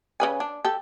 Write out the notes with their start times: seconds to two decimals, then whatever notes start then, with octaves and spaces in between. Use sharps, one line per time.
0.20 C#3 B4 G#5
0.40 D4
0.65 G4 A4